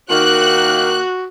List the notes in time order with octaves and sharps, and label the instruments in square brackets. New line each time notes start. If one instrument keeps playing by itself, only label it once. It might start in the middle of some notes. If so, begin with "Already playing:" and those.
[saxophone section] D#3 A#3 [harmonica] F#4 [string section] F#6